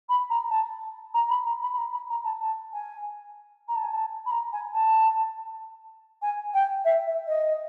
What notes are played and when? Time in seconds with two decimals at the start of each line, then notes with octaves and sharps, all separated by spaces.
0.09 B5
0.30 A#5
0.50 A5
1.14 A#5
1.30 B5
1.46 A#5
1.62 B5
1.73 B5
1.78 A#5
1.93 B5
2.10 A#5
2.25 A5
2.41 A5
2.73 G#5
3.68 A#5
3.76 A5
3.83 G#5
3.91 A5
4.26 B5
4.31 A#5
4.53 G#5
4.74 A5
6.22 G#5
6.54 G5
6.85 E5
7.07 E5
7.27 D#5